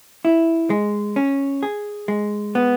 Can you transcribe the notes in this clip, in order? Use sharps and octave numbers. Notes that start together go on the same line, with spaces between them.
E4
G#3
C#4
G#4
G#3
B3